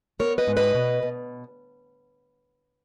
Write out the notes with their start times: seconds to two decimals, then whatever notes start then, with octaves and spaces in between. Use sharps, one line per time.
0.19 B3 A#4 C#5
0.38 B4 D#5
0.47 G#2
0.57 B4 D#5
0.75 B2
1.03 B2